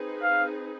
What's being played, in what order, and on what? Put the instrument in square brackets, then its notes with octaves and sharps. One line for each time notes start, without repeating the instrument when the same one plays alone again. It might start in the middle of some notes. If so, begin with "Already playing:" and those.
Already playing: [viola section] C4 D#4 G#4 B4
[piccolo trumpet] F5